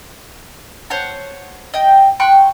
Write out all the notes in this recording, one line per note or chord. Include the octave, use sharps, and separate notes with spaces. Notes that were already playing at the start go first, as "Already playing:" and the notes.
C5 C#5 F#5 A5
D#5 G5
G5 C6 C#6 F#6